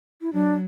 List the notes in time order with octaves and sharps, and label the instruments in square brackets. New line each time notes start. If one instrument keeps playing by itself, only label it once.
[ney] E4
[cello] F#3 [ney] D4